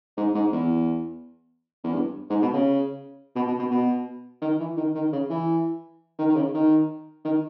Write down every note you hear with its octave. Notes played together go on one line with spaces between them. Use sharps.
G#2
G#2
E2
E2
G2
G#2
B2
C#3
B2
B2
B2
B2
D#3
E3
D#3
D#3
C#3
E3
D#3
D#3
C#3
D#3
D#3